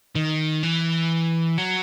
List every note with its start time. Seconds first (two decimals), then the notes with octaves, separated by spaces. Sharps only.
0.15 D#3
0.63 E3
1.58 F#3